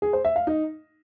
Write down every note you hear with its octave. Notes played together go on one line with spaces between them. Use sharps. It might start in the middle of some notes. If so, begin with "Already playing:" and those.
G#4
C5
E5
F5
D#4